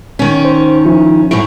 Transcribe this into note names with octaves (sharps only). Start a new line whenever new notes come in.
D#3 C#4
C5
F3 E4 F4
F#2 A2 A3 E4